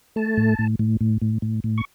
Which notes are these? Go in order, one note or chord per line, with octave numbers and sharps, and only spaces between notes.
A3 A5
A2
A2
A2
A2
A2
A2
A2
C#6